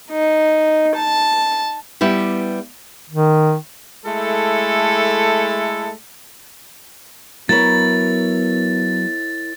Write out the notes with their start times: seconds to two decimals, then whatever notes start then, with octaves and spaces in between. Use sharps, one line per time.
0.11 D#4
0.95 A5
2.01 G3 B3 E4 G4
3.10 D#3
4.05 G#3 A3 E4 A4
7.49 F#3 B3 E4 A#4 C#5 B5 A6